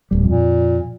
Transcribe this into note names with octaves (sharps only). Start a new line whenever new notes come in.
D1 G3
F2 A#2